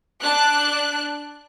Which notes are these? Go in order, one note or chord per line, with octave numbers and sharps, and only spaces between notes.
D4 F#6